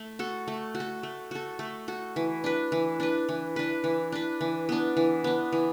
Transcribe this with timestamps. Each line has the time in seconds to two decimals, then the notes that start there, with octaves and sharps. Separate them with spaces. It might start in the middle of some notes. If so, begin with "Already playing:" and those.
Already playing: A3
0.19 F#4 A4
0.48 A3
0.75 F#4
0.80 A4
1.03 A3
1.31 F#4 A4
1.59 A3
1.88 F#4 A4
2.16 E3
2.44 D4 B4
2.72 E3
3.00 D4 B4
3.29 E3
3.56 D4 B4
3.84 E3
4.12 D4 B4
4.41 E3
4.69 B3 D4
4.97 E3
5.24 B3 D4
5.52 E3